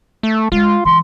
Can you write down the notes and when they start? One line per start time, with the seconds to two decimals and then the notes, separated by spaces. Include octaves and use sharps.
0.23 A3
0.52 G#3 F4
0.85 E3 C6